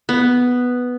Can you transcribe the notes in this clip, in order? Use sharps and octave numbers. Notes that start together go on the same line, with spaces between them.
B3